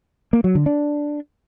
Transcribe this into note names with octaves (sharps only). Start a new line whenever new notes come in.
A#3
F#3
D3
D4